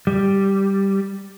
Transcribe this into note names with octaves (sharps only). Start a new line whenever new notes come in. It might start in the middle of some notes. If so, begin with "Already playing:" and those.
G3